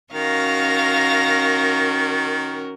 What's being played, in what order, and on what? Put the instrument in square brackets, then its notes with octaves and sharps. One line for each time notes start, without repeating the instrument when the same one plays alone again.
[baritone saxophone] D#3 [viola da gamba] C#4 F#4 A#4 [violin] F5 A#6